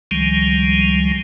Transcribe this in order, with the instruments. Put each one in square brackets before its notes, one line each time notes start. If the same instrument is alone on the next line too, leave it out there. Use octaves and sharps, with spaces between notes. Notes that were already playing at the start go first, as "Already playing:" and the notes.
[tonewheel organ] C#2 D#3 F3 G3 G#3